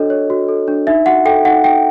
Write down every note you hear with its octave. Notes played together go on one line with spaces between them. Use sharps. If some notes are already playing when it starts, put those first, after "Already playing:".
Already playing: D4 F#4 A4 C#5 D#5
C#5
F#4
A4
D4
D#4 E5
F#4 F#5
A4 G5
D#4 F#5
D#4 G5